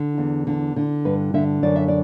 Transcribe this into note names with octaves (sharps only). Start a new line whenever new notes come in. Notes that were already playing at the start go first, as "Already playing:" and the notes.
Already playing: D3
E2
D3
D3
G2 B4
D3 E5
F#2 D5
E5
D5